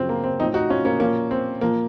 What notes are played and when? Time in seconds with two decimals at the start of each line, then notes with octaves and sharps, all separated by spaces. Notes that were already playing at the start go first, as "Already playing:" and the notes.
Already playing: F#2 C#3 F3 C4
0.09 A#3
0.24 C4
0.39 F3 C4 D#4
0.43 A2
0.54 D#4 F#4
0.70 C#4 F4
0.85 A#3 C#4
1.00 A#2 F3 A#3 C#4
1.31 C4
1.61 A#2 F3 A#3